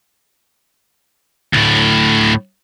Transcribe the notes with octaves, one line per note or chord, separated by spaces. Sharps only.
D2 A2